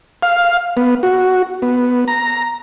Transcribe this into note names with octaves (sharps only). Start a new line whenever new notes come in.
F5
B3
F#4
B3
A#5